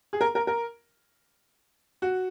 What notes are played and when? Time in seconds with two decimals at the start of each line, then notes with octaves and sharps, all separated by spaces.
0.13 G#4
0.21 A#4
0.35 A#4
0.47 A#4
2.02 F#4